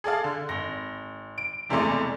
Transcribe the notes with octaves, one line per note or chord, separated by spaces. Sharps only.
G#4 A4 D5 F5
D3
G#1 A#6
D7
F1 E2 C3 G#3 A3 D5